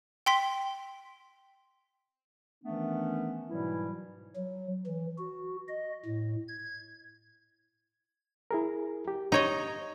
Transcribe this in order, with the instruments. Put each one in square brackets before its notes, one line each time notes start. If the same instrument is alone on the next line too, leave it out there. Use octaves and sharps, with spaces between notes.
[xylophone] G5 C6 B6
[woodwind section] D#3 E3 A3 B3 C#4 D4
G#2 B2 E3 F#3 G3 E4
[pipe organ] F#3
E3
F#4
D#5
A2
G#6
[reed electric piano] E4 G#4 A#4
G4
[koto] D#4 C#5 D#5